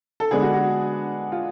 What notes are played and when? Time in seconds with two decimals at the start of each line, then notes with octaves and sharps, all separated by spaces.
0.20 A4
0.31 D3 G#3 B3 D4 G#4
0.42 F#4
0.54 F#4
1.32 F4